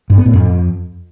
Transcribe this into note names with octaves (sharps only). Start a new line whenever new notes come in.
G2
B3
A2
F2